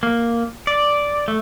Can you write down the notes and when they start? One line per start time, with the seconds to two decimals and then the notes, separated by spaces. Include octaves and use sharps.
0.03 A#3
0.67 D5
1.28 A3